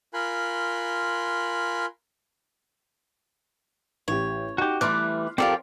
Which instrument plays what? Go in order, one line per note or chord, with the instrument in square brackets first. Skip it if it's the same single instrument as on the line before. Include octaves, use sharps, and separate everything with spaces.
[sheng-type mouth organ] F4 A#4 G#5 B5 C6 F#6
[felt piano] A1 G4 [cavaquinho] C#5
[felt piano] D#4 [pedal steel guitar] F#4 G4
[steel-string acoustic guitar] E3 G3 A3 [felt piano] C6 F6 [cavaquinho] D6 [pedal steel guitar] F#6
[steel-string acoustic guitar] F3 [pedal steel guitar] C4 A4 A#4 [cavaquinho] F4 G4 D5